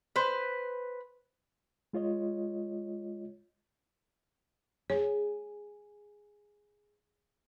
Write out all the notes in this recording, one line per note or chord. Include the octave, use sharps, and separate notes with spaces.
B4 C5
G#3 F4 C#5 D#5
G#4 C#5